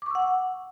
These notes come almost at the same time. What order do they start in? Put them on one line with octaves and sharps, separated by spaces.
D6 C#6 E6 F#5